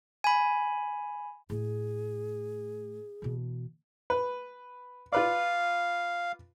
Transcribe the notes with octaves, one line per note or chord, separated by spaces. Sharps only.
G#5 B5
A2 A3 G#4
B2 E3
B4
F4 B4 D5 F5